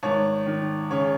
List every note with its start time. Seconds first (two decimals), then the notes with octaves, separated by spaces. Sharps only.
0.03 G#1 C#5
0.46 D#3
0.91 C#3 C#5